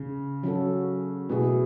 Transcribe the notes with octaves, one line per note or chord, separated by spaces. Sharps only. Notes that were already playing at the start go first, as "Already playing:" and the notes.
Already playing: C#3
F#3 C#4 F#4 A4
B2 A3 E4 G#4